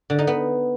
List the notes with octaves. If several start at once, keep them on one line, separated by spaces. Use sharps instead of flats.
D3
D#4
B3